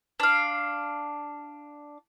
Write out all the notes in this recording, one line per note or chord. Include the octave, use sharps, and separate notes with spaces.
D4 F5